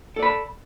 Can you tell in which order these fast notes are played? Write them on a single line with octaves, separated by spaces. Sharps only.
A4 D5 B5 A5